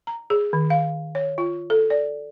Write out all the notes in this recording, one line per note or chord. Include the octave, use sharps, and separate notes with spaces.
A#5
G#4
D#3
F5
C#5
F4
A4
D5